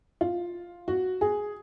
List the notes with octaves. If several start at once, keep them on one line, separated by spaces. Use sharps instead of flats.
F4
F#4
G#4